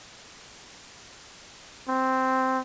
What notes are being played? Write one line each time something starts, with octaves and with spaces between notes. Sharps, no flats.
C4